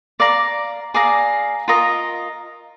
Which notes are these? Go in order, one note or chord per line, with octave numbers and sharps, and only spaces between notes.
D5 F5 A#5
G#4 D5 F5 A#5
F4 A#4 D#5 A#5